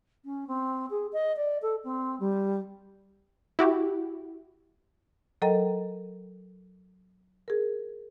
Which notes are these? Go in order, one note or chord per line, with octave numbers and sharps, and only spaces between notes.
C#4
C4
G#4
D#5
D5
A4
C4
G3
E4 F#4 G4
F#3 A4 A#4 D#5 G5 A#5
G#4 A#4